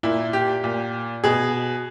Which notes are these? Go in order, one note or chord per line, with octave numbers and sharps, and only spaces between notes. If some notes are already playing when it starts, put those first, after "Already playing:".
A#2 E4
G4
A#2
B2 G#4